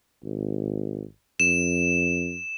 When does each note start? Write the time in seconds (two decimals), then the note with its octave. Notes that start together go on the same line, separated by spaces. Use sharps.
0.24 G#1
1.40 F2 E7